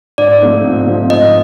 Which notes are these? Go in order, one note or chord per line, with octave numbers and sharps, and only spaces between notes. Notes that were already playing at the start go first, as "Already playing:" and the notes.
G#2 D5
F3 A3 C4 D#4
G#2
F3 A3 C4 D#4
G#2 D#5